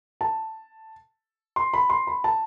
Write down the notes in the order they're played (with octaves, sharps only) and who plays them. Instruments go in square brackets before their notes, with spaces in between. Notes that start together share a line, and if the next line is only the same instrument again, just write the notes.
[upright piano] A5
C6
B5
C6
B5
A5